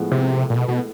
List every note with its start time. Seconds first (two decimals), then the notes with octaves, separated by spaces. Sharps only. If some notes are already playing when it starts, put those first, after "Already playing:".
Already playing: A2 F3 G#3 B3
0.12 C3
0.50 A#2
0.57 B2
0.68 B2